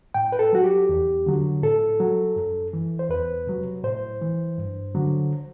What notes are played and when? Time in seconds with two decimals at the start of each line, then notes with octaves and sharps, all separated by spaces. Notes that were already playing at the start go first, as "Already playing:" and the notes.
0.14 A2 G5
0.32 B4
0.39 A4
0.53 F#3 F#4
0.64 G4
0.89 E2
1.26 D3 F#3
1.62 A2 A4
2.00 F#3
2.36 F#2
2.73 E3
2.99 C5
3.10 E2 B4
3.47 C3 F#3
3.84 A2 C5
4.22 E3
4.58 G2
4.95 D3 F#3